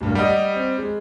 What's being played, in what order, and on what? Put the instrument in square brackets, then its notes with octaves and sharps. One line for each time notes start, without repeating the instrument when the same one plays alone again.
[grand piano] D1 G2 A#3
[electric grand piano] G3 D#5 [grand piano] G4 F#5 D#6
[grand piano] C4
G#3